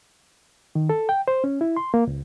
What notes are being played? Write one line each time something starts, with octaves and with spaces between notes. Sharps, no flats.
D#3
A4
G5
C5
C#4
E4
C6
A#3
C#2